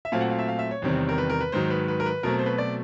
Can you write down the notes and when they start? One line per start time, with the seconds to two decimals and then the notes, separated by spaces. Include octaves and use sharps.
0.05 E5
0.12 A#2 F#3 A3 C4 F5
0.21 F#5
0.31 F5
0.39 E5
0.48 F5
0.59 E5
0.71 C#5
0.82 E2 C3 D#3 G3 C4
1.09 A#4
1.18 B4
1.30 A#4
1.41 B4
1.52 G#2 D#3 F#3 C5
1.70 B4
1.88 B4
2.00 A#4
2.06 B4
2.23 B2 F#3 A3 C4 A#4
2.39 C5
2.46 B4
2.58 D5